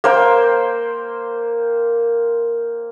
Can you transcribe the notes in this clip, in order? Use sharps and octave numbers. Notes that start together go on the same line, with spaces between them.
A#3 C5 G5